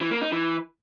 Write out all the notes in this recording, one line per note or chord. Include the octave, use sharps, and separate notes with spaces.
E3
A#3
D#4
E3